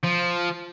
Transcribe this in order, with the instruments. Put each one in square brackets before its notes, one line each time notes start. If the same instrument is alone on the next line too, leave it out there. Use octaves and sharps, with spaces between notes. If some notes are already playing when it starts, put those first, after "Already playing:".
[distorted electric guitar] F3